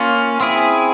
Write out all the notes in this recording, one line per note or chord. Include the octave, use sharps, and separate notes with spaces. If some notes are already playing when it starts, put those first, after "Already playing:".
Already playing: A#3 C#4 F4
C4 E4 G#4